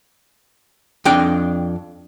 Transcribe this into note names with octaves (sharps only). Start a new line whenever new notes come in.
F2 D4 G5